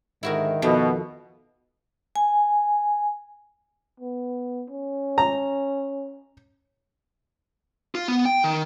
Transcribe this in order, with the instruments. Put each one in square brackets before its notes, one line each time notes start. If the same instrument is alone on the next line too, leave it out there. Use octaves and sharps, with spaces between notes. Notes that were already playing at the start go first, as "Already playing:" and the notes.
[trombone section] G#2 D3 D#3 [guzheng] E4 F#4 A#4
[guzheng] F2 D#3 [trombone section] B2
[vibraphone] G#5
[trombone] B3
C#4
[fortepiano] A#5
[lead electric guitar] F4
B3
G5
D#3